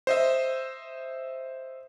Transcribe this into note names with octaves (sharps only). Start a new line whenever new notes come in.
C5 D#5 E5